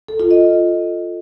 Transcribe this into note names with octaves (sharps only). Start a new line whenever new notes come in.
A4
F4
D#5